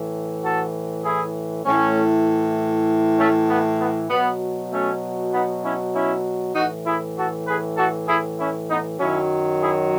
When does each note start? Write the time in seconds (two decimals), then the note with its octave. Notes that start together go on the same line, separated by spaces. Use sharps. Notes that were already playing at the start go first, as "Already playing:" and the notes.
Already playing: A2 E3
0.43 F#4 A4
1.04 E4 G#4
1.65 A2 E3 A3 C#4
3.18 A3 C#4
3.49 B3
3.80 B3
4.10 B2 F#3 B3
4.71 A3 C#4
5.32 B3 D#4
5.63 C#4 E4
5.94 C#4 E4
6.55 A2 E3 D#4 F#4
6.86 E4 G#4
7.17 F#4 A4
7.47 G#4 B4
7.77 F#4 A4
8.08 E4 G#4
8.39 C#4 E4
8.69 B3 D#4
8.99 F#2 D#3 F#3 C#4 E4
9.60 E4 G#4